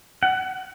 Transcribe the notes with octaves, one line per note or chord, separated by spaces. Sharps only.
F#5